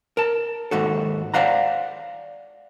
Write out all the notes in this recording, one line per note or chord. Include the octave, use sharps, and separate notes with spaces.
A#4 A5
D#2 G#2 F#4 A4
C5 D5 F5 F#5 A#5